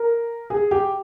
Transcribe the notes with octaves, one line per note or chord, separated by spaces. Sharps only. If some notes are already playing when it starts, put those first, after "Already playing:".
Already playing: A#4
G#4
G4